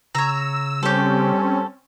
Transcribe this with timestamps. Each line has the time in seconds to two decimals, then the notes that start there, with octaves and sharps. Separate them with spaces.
0.15 C#3 C#5 A#5 E6
0.83 G3 C4 C#4 G4 A4